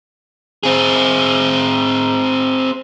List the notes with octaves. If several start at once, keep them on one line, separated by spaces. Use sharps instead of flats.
C4 G#4